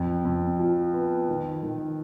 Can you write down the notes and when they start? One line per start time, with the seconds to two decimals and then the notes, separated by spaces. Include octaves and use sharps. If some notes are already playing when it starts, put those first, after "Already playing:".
Already playing: F2
0.25 F2
0.59 F3
0.94 B3
1.29 D#3
1.63 D#3